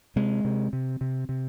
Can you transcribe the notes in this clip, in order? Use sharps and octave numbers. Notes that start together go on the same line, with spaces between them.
C3 G#3
C3
C3
C3
C3